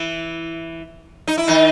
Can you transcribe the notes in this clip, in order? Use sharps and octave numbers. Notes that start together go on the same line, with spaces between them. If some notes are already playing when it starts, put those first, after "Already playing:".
Already playing: E3 E4
D#4
E4
D#3 D#4